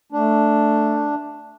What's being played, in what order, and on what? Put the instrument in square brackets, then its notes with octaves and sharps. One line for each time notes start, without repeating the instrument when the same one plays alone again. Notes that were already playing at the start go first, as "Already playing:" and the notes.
[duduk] A3 [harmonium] D4